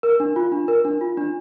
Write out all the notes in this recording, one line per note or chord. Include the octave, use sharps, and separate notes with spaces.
A#4
D4
F4
D4
A#4
D4
F4
D4